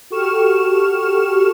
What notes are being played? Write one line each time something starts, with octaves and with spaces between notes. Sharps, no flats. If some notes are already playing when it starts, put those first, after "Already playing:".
F#4 G4 A4 C#6 F6 E7